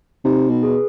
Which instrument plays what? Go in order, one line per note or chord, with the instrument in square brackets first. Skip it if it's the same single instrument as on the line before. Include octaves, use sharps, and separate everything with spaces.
[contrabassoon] C3 [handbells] D#4
[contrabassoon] B2
[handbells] G#4 B4